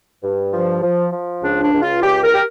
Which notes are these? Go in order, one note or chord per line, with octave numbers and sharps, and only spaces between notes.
G2
F3
F3
F3
C#2 D4
D4
C#2
F4
C#2 G4
A#4
G4